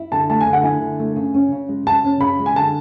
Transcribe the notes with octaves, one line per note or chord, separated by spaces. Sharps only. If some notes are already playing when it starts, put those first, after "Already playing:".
Already playing: E4
D3 A5
A3 A5
G#5
D3
F#5
E4 G#5
D3
A3
C#3
C#4
C#3
G#3
C#3 A5
C#4
C#3 B5
G#3
G#5
D3 A5